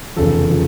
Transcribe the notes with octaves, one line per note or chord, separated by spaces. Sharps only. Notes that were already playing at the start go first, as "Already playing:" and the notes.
F1 E2 C#3 F3 A4
C#3 F3